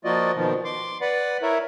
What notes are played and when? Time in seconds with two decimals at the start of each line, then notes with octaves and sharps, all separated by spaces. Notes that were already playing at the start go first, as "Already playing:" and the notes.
0.05 F3 A#3 F4 F#4 D5 D#5
0.35 B2 D#3 F3
0.65 C6 D6
1.01 B4 D5 F#5 B5
1.42 E4 A#4 C#5 E5